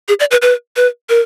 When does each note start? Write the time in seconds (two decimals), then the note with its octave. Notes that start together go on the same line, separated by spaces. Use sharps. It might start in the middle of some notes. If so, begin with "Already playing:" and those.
0.08 G#4
0.20 D5
0.31 B4
0.42 B4
0.76 B4
1.09 A#4